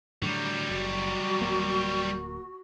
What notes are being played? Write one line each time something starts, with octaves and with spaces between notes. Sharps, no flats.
A2 D3 F#3 G3
F#1 F#4
D1 A#3